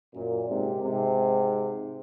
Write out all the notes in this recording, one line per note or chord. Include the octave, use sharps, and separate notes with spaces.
F#2 A#2
G#2 C3
G#2 C3